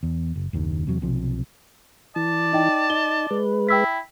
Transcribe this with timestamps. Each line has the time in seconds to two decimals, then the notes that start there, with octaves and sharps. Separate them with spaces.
0.03 E2
0.36 F#1
0.53 F#1 D#2 D#3
0.87 E2 C3 F#3
1.02 B1 C3 F3
2.16 E3 D5 A5
2.53 D#4 D#5 G5
2.90 D#4 G7
3.31 G#3 B4
3.69 E4 G5 E6 B6